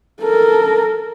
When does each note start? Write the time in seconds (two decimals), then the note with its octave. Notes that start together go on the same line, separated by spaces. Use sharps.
0.22 A4 A#4